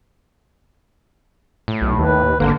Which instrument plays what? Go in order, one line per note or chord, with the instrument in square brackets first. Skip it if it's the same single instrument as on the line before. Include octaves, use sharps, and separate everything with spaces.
[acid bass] A2
[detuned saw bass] B1
[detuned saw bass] D#2 [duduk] B4
[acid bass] G#1 [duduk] D3 [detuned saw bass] A#3